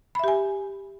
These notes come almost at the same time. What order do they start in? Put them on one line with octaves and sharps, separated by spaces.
B5 E5 G4 G#5